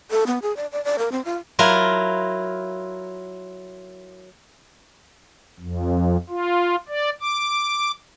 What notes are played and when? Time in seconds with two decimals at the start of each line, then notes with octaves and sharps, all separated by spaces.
0.11 A4
0.27 B3
0.42 G#4
0.57 D5
0.72 D5
0.85 D5
0.99 A#4
1.12 C4
1.25 F4
1.59 F#3 E4 F4 A#4
5.60 F2
6.29 F4
6.89 D5
7.21 D6